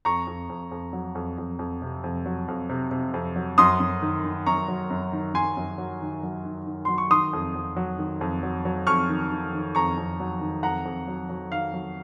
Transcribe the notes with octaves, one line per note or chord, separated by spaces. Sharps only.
F2 A#5 C#6
F2
F2
F2
F#3
F2
F2
F2
C3
F2
F#3
F2
C3
C3
F2
F#3
F#2 C6 D#6
F#2
D#3
D#3
F#2 A#5 C#6
F#3
F#2
D#3
F#2 G#5 C6
F#2
F#3
D#3
F#3
D#3
D#3
F#3 C6
C#6
D#3 C6 D#6
F2
F2
F#3
D#3
F2
F#3
F#3
F2 C#6 F6
D#3
D#3
D#3
F2 A#5 C#6
F2
F#3
D#3
F2 F#5 A#5
F2
F#3
F#3
D#3 F5
F#3